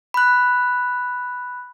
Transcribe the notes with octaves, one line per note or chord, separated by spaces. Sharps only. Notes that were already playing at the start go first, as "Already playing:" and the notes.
B5 F#6